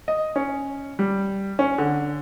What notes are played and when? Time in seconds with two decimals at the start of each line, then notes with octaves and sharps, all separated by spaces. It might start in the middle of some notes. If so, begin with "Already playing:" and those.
0.08 D#5
0.36 C#4
0.99 G3
1.59 C#4
1.78 D3